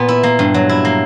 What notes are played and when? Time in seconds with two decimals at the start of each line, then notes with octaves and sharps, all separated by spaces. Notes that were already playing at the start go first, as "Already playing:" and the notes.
Already playing: A#2 B3
0.08 E4
0.23 A#3
0.39 G2
0.54 F#3
0.69 E4
0.85 A#3